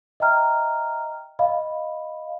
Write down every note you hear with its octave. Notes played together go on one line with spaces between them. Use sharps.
D#5 E5 G5 A#5 F6
D#5 F5 B5